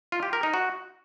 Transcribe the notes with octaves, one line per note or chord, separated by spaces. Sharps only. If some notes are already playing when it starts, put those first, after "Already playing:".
F4
G4
A#4
D#4
F#4